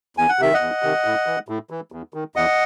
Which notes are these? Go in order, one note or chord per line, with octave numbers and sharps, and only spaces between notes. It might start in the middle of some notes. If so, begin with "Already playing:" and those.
E2 G#5
F#5
C3 D#3 E5
D#5 F#5
E2
C3 D#3
A2
E3
A2
E3
E2
D#3
E2 D#5 F#5